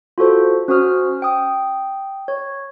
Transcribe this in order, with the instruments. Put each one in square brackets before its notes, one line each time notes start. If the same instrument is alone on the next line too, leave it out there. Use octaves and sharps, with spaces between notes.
[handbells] F4 F#4 A4 C5
C#4 F#4 C5 D#6 F6
G5 D#6
C#5